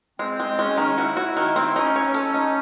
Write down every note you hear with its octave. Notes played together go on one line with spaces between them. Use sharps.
G#3 C4
G#3
G#3 C#4
D#3
E4 F#4
F#4
D#3
C4
C#4 D#4
C#5
A4
D#4